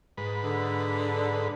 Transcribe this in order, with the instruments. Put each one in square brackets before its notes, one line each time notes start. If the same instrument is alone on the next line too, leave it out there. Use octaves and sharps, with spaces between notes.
[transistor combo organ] G#2 B4
[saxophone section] D3